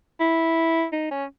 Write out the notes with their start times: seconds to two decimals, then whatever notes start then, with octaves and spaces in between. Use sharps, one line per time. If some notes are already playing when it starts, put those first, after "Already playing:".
0.20 E4
0.93 D#4
1.11 C#4